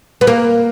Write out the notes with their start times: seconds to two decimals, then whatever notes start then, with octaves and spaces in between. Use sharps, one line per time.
0.21 B3
0.27 A#3